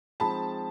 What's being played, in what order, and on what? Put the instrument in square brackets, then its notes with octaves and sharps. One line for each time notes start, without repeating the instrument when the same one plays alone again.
[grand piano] F3 G#3 C4 D#4 G#4 [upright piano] A5 B5